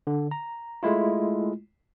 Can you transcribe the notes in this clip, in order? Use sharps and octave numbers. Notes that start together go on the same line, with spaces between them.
D3
A#5
G#3 A3 E4 F4